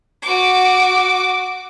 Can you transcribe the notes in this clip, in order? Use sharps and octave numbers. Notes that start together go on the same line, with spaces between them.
F#4 D6